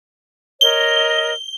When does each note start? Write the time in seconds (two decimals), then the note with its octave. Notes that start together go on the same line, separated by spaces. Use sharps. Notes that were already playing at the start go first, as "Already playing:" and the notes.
0.61 A#4 C#5 D#5 G7